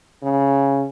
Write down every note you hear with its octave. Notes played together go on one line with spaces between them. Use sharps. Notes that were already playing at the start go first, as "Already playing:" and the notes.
C#3